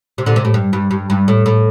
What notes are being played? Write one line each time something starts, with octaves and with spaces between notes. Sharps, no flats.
C3
A#2 D3
C3
A2
G2
G2
G2
G2
A2
A2